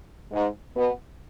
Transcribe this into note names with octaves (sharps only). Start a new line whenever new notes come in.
G#2 G#3
B2 B3